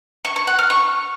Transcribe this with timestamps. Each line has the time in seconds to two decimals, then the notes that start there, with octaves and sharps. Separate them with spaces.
0.25 C#6
0.36 C#6
0.47 F#5
0.59 F6
0.70 C#6